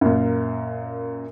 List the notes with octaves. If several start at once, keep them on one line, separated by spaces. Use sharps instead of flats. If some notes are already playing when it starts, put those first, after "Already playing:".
F#2 A#2